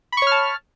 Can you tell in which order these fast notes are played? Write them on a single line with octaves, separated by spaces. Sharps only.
B5 C#6 C#5 F6 A5